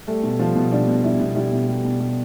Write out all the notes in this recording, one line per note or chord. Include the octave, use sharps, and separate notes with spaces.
G3 A3 A4
B2
F3 G3 F4
B2
G3 D4
B2
G3 E4
B2
G3 E4
B2
G3
B2
G3